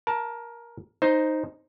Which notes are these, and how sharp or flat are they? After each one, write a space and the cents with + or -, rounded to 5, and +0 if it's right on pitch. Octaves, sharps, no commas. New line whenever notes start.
A#4 +15 A5 +0
D#4 +0 C5 +5